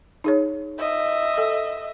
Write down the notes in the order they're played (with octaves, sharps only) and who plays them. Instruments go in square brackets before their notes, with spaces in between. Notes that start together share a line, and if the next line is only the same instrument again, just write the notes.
[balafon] D#4 G#4 C#5
[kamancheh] D#5 E5
[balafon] A4